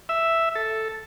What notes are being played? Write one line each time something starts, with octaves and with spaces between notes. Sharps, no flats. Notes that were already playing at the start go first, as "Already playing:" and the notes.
E5
A4